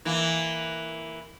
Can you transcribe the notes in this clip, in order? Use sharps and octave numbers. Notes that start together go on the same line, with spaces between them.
E3 A#3